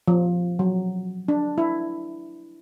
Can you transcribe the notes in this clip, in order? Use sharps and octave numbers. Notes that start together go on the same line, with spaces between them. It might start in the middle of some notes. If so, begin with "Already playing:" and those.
F3
F#3
D4
E4